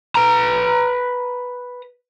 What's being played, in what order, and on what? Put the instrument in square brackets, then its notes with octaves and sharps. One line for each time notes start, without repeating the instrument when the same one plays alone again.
[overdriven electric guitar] B4 A#5